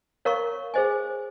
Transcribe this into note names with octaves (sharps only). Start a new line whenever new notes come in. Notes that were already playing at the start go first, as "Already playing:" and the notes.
A#4 C#5 F5 A#5 C#6
G#4 C5 D#5 G#5